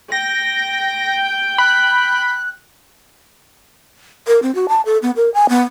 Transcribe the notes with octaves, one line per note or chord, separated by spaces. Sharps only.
G5 A#6
B5 F#6
A#4
C4
F#4
A5
A4
B3
A#4
G#5
B3